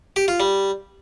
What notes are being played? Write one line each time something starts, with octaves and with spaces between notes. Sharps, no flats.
G4
F4
G3